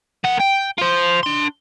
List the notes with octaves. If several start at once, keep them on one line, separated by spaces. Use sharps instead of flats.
A#3 F#5
G5
F4 C5
D4 C6